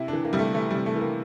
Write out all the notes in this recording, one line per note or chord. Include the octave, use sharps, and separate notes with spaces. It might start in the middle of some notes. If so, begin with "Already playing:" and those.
Already playing: C3 E4
E3 D4
A#3
C3 G3
A3
E3 A3
C3 G3
A3
E3
A#3